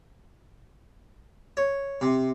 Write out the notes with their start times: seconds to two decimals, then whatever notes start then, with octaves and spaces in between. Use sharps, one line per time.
1.57 C#5
2.01 C3